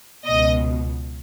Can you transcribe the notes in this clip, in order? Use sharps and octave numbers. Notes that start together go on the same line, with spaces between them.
C#2 B2 D#5